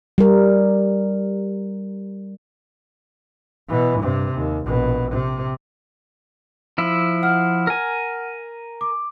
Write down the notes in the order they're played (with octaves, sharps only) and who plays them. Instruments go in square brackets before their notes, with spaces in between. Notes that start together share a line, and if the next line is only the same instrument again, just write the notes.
[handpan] G3 A#4
[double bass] B2 E3
G2 C3
D#2
A#1 B2
C3
[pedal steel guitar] F3 E4
[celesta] F#5 F6
[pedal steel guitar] A#4 G#5
[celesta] D6